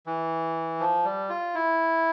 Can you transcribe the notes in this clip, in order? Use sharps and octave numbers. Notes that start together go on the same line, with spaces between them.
E3
F3
G3
F4
E4